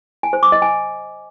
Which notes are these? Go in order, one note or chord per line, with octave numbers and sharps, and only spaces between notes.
G#5
C5
D6
D#5
G#5